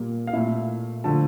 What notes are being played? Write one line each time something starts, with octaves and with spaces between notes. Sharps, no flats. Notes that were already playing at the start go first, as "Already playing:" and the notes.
Already playing: A#2 G3 A#3
F5
A#2 A3 E4 E5
D3 F3 A3 A5